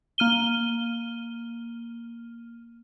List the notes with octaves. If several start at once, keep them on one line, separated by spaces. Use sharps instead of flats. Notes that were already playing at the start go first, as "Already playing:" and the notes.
A#3 F6 D#7 G7